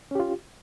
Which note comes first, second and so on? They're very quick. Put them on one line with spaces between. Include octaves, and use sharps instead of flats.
C#4 G4 F4